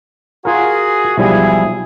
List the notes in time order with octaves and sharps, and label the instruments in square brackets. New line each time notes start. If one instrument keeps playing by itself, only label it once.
[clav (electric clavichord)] F4 A#4 [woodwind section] F#4 G#4
[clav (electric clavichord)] B1 F3 G3 [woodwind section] E4 G#4